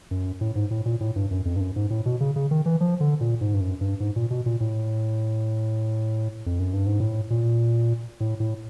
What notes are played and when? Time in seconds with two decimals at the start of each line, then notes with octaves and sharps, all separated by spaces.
0.11 F#2
0.41 A2
0.55 G#2
0.71 A2
0.86 A#2
1.00 A2
1.16 G2
1.31 F#2
1.45 F2
1.56 G2
1.61 F#2
1.76 G#2
1.90 A2
2.06 B2
2.20 C#3
2.36 C#3
2.51 D#3
2.66 E3
2.81 F3
3.00 D3
3.21 A#2
3.41 G#2
3.54 G2
3.61 F#2
3.81 G2
4.00 G#2
4.16 A#2
4.30 B2
4.46 A#2
4.60 A2
6.46 F2
6.59 F#2
6.74 G2
6.87 G#2
7.00 A2
7.30 A#2
8.20 A2
8.40 A2